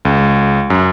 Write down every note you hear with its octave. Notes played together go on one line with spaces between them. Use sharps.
C#2
F#2